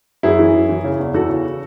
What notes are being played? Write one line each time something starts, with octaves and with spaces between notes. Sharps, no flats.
F#2 E4 G#4
E3
F#2
E3
C#3
E2
E3 F#4 A4
C#3